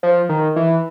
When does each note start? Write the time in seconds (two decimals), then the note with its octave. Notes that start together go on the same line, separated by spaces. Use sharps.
0.03 F3
0.29 D#3
0.56 E3